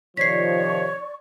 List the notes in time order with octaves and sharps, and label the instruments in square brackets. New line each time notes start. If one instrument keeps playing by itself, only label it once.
[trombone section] C3 D#3 F3 [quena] C#5 [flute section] D5 C#6 [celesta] B6 C7